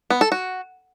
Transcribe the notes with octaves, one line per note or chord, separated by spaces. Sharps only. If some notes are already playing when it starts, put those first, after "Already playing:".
B3
A4
F#4